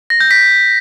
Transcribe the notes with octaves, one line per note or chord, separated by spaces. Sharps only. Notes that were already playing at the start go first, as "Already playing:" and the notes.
A#6
G6
B6